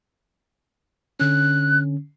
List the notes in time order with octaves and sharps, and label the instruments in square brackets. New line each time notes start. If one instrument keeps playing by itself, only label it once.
[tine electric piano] D3 C#4 [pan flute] F#6